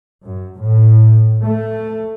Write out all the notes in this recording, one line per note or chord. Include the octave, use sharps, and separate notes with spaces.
F#2
A2
A3